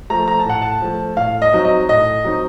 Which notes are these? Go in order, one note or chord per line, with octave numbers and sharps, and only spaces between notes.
F3 A3 A#5
A#5
A5
A2 F#5
A5
F3 A3
A2 F5
D#5
F#3 C4 D#4
D#5
A2 D#5
F#3 C4 D#4